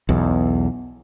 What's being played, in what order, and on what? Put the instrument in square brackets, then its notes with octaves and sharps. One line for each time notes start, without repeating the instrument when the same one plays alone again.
[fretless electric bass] B1 E2